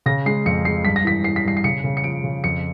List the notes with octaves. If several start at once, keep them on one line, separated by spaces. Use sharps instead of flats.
C#3 A#6
G#3 C7
F2 C#7
G#3 C7
G2 B6
A#6
E3 B6
E3 C7
B6
G2 C7
C7
C#3 C#7
C#3
C#7
F3 D7
C#3
F2 C#7